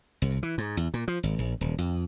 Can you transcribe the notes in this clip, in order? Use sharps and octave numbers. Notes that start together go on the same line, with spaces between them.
C2
E3
G#2
E2
A#2
F3
G#1
A#1
D#1
F2